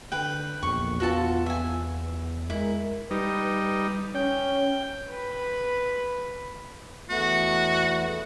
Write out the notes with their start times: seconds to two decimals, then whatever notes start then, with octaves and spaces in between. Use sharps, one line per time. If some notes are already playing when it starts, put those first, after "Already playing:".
0.12 D3 B4 G5
0.63 A#1 E2 C#6
1.00 B3 F4 F#4 A4 A5
1.46 B3 E5 G#5
2.50 G#3 E4 A#4
3.11 G3 D#4 B4
4.15 C#4 G5
5.10 B4 B5
7.10 E2 A3 B3 F#4